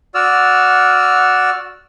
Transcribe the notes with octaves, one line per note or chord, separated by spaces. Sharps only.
F#4 D5 E6 F6